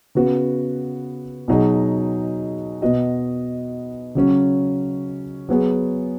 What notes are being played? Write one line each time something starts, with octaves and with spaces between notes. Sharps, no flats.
C#3 B3 F#4 B4
B2 F#3 D#4 G#4 D#5
B2 B3 F#4 D#5
C#3 F#3 C#4
F#3 B3 G#4